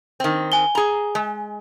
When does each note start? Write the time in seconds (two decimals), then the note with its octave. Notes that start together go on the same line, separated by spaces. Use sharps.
0.20 D#3 C4
0.52 G#5 G7
0.75 G#4 A#5
1.15 G#3